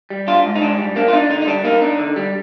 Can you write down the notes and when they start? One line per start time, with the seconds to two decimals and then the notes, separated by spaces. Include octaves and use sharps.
0.10 G3
0.27 D4 F4
0.45 G#2
0.56 D#4
0.62 G#2 D4
0.79 G3
0.96 A#3 D4
1.08 F4
1.13 D4 D#4
1.30 D3 D#4
1.42 D#4
1.47 G3 D4
1.64 A#3 D#4
1.82 D4
1.99 D3
2.16 G3